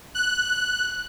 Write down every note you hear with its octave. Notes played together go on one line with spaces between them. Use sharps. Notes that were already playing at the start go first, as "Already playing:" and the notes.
F#6